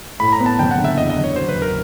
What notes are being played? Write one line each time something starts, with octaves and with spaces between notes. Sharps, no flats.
A2 B5
A#5
B3
A5
F#1 G5
F#5
D3
E5
E2 D#5
D#5
F#1
C#5
F#3 C5
B4
E1
A#4